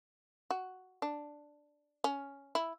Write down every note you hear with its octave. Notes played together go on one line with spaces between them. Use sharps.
F#4
D4
C#4
E4